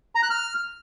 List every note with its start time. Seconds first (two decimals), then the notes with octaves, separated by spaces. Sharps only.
0.15 A#5
0.23 F#6
0.30 F6